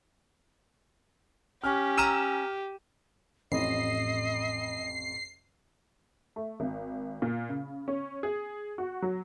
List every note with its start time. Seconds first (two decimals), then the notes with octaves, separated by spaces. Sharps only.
1.64 C#4 G4 F6
1.97 A#5 E6 F6 D#7 E7
3.52 A1 F2 A2 D#5 C7
6.36 A3
6.60 G#1
7.22 A#2
7.49 C#3
7.88 C#4
8.23 G#4
8.78 F#4
9.02 F#3